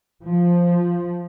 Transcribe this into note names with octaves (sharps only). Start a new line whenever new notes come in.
F3